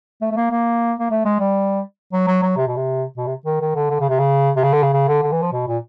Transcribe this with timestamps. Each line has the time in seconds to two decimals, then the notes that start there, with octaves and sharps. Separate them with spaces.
0.22 A3
0.32 A3
0.37 A#3
0.51 A#3
1.00 A#3
1.11 A3
1.25 G#3
1.40 G3
2.13 F#3
2.28 F#3
2.43 F#3
2.57 C3
2.68 B2
2.77 C3
3.17 B2
3.27 C3
3.46 D#3
3.61 D#3
3.76 D3
3.90 D3
4.00 C#3
4.09 C3
4.19 C#3
4.56 C3
4.64 C#3
4.73 D3
4.83 C#3
4.93 C#3
5.08 D3
5.23 D3
5.32 E3
5.42 F3
5.53 B2
5.68 A#2